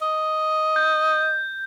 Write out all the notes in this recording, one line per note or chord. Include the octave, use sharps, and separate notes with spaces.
D#5
G6